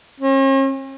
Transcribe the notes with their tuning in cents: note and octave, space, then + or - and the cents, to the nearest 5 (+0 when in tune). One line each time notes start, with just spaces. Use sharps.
C#4 -45